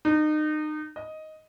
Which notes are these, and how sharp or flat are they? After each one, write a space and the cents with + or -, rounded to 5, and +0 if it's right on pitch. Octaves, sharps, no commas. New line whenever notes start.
D#4 -30
D#5 +5